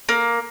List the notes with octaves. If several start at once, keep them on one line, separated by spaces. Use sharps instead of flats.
A#3